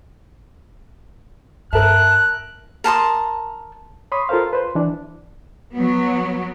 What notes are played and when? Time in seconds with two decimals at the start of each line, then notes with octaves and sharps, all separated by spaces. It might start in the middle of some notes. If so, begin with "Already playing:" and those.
1.73 G2 A#4 E5 A5 F#6
2.84 A#4 A5 C6 D#6
4.12 C#5 B5 C6 D#6
4.29 F4 A4 A#4 C5 F5
4.53 B4 C5
4.75 E3 D4
5.74 F#3 B3